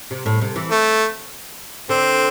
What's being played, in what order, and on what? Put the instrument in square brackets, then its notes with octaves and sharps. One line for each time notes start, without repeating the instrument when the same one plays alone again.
[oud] C3
A2
C3
E3
[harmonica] A3
[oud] D3 [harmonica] C4